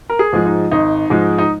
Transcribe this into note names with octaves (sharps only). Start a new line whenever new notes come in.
A#4
G#4
G#2 F3 G#3
D#4
G#1 D#4
G#2 F3 G#3
D#4